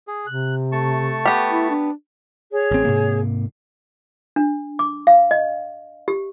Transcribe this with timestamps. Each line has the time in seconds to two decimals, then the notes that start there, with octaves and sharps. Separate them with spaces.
0.07 G#4
0.27 C3 F#6
0.72 A3 A5 C#6
1.25 B3 G4
1.49 E4
1.70 D4
2.52 G#4 C#5
2.71 A1 C4
2.85 G#2 C3 A#3
4.36 D4
4.79 D6
5.07 F5
5.31 D#5
6.08 G4